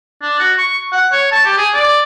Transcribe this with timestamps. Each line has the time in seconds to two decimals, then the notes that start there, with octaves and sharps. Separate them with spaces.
0.22 D4
0.39 F#4
0.58 C#6
0.92 F#5
1.12 C#5
1.32 A5
1.45 G4
1.57 G#4
1.74 D5